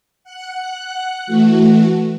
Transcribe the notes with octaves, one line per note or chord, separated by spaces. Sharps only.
F#5 F#6
E3 A3 F#4